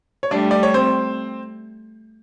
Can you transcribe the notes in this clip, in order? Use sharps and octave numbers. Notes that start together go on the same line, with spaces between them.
C#5
G3 A3 D4 D5
D5
C#5
C4 C5